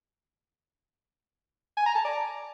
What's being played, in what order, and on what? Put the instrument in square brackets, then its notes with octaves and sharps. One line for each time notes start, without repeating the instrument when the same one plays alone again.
[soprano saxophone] G#5
A#5
A5
D5